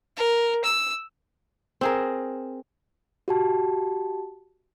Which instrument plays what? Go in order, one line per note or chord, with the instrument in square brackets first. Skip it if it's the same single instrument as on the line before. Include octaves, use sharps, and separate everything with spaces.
[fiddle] A#4
E6
[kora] C4 G#4 A#4
[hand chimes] F#4 G4 A5